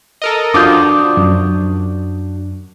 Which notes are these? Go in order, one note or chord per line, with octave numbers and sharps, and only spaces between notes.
A4 A#4 D#5
F3 D4 F4 F#4 D6 D#6 G6
F#2